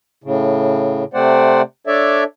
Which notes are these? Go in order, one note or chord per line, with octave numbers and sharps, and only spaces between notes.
A2 C#3
C3 A3 C4 C5 D5 F#5
D4 A4 C#5 D5 E5